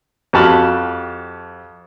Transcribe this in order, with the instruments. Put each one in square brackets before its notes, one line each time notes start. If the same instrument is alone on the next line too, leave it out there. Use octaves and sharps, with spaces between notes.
[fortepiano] F2 F#4 G4 A5 B5 F6